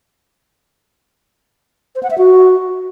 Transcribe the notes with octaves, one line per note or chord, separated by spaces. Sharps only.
C5
F#5
E5
F#4